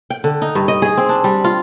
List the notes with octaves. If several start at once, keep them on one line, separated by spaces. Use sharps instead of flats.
G5
D3
D#4
G2
D#5
G#4
C4
D4
G3
F4